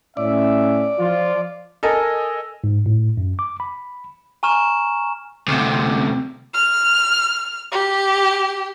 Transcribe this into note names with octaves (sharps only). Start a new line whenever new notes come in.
A2 C#4 D5 E5
F3 F4
A4 A#4 D#5 G#5
G#2
A2
F#2
D6
B5
G#5 A#5 C#6 F6 E7
D2 C3
F6
G4